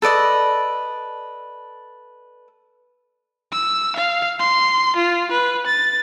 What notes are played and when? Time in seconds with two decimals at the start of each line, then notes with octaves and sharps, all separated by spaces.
0.02 A4 B4 D5 D#5
3.52 E6
3.96 F5
4.39 C6
4.96 F4
5.32 B4
5.66 A6